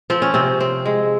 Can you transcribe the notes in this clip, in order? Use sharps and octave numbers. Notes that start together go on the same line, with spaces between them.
F3 C4
C#4
C3 C4
C4
G#3